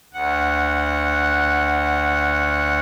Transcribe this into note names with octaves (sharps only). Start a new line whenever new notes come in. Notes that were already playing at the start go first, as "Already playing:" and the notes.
D2 F#5